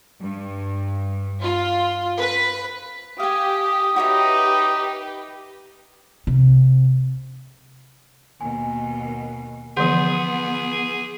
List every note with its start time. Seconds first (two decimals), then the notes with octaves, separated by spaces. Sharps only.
0.20 G2
1.42 F4
2.21 B4
3.20 G4 F5 G#5 D#6
3.96 D#4 F#4 G4 B4 C#5 E5
6.27 C3
8.41 D#2 B2 G#5
9.77 D3 E3 F3 B3 G#4 F#5 C6 G6